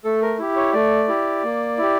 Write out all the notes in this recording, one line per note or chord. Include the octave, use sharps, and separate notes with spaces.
A3 A4
A#4
E4 G4
C#5
A3 D5
E4 G4
A#3
E4 G4